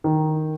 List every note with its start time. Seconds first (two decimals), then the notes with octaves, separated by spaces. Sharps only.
0.04 D#3